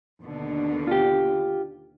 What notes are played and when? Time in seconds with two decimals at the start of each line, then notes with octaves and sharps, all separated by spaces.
0.20 D#2 B2 D3
0.87 F4 G4